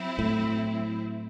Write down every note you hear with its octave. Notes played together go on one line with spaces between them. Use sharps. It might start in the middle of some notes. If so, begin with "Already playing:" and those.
Already playing: F#3 C4 E4
A2